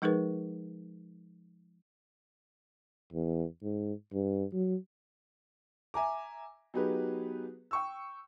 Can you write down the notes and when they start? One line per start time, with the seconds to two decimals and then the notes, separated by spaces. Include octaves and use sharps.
0.02 F3 G#3 D#4 G#4 A#4 B4
3.13 E2
3.63 G#2
4.13 G2
4.53 F#3
5.94 E5 G#5 A#5 D6
6.74 F#3 B3 D#4 G4 G#4 B4
7.71 G5 C#6 E6